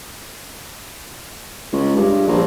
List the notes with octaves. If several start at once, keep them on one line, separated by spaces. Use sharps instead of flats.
C#2
G2
A#1